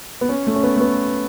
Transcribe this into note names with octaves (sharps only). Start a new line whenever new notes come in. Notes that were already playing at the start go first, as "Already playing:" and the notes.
B3
C#4
A3
C#4
B3
A3
B3